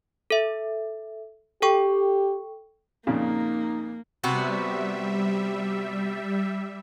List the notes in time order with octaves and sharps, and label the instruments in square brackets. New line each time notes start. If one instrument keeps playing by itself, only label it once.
[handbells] A4 E5
[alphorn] G4 [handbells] A4 G5 C#6
[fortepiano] F2 A#2 C#3 [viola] A#3 [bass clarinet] D#4
[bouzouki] C3 B3 F#4 [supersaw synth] G3 E5